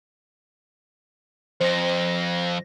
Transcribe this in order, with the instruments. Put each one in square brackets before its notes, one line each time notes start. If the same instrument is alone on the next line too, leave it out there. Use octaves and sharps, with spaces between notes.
[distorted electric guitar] F2 [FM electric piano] C5 A#6